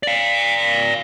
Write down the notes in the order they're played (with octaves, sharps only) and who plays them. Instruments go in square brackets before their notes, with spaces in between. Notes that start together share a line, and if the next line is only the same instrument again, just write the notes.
[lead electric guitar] D5 F5